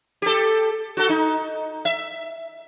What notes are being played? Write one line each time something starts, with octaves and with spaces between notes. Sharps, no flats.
G4 A4
F#4 A4
D#4
E5